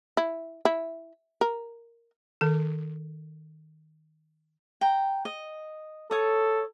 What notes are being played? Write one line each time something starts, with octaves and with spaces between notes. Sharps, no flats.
E4
E4
A#4
D#3 A4
G5 A#5
D#5
A4 C#5 D#6